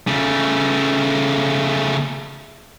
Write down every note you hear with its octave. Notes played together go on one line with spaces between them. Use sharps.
C#3 A3